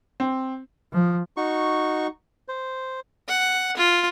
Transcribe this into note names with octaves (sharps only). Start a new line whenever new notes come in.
C4
F3
D#4 F#4 C#6
C5
F#5
F4